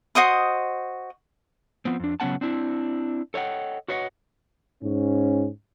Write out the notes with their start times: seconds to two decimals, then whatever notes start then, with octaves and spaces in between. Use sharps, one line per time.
0.15 F#4 C5 D#5 D#6
1.85 F3 B3 C4
2.00 F2 D4
2.20 C#3 F#3 B3 C#4 F#5 A5
2.41 C4 D4 E4
3.34 A4 C#5 D#5 F#5 G5
3.88 F#4 B4 C#5 D#5 F5 F#5
4.82 G#2 C#4